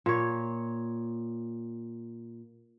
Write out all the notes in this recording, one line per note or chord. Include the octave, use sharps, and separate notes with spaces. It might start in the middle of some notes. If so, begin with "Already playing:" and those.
A#2 C#5